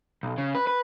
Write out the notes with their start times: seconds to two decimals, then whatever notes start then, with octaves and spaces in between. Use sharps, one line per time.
0.23 B1
0.38 C#3
0.55 B4
0.67 B4